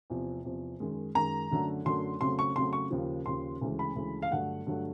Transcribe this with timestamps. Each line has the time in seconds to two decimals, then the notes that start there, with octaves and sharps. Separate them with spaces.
0.10 E2 C3 F3
0.45 E2 C3 F3
0.80 F#2 D#3 G#3
1.15 F#2 D#3 G#3 A#5
1.51 F#2 D3 F#3 A3
1.85 F#2 D3 F#3 A3 C6
2.21 F2 C#3 F#3 A3 C6
2.39 C#6
2.56 F2 C#3 F#3 A3 C6
2.73 C#6
2.90 D#2 C#3 F3
3.26 D#2 C#3 F3 C6
3.61 D2 C#3 E3 G#3
3.79 B5
3.96 D2 C#3 E3 G#3
4.22 F5
4.31 G2 D3 F#3 A3 F#5
4.67 G2 D3 F#3 A3